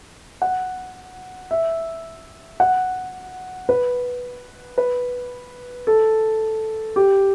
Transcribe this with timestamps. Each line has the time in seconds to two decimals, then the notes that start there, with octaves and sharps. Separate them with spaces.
0.42 F#5
1.51 E5
2.60 F#5
3.69 B4
4.78 B4
5.87 A4
6.96 G4